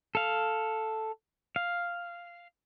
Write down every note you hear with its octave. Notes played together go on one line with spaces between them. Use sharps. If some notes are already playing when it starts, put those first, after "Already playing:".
A4 F5
F5